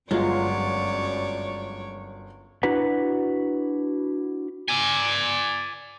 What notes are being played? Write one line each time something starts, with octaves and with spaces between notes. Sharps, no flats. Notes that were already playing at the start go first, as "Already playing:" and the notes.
G1 F#2 F#3 G#3 F4 C#5 D5
D4 E4 F#4 B4 F#5 A#5
D5 G#5